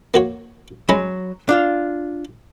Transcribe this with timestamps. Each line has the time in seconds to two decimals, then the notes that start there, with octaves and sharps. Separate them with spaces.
0.14 A#3 F#4 C#5
0.89 F#3 G#3 C#4 B5
1.49 D4 F4 F5